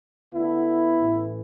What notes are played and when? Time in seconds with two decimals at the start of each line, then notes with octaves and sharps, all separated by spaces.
0.32 D2 D3 B3 E4
0.99 A1 A2 E3